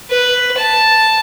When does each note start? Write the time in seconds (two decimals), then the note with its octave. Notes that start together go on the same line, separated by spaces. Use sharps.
0.11 B4
0.57 A5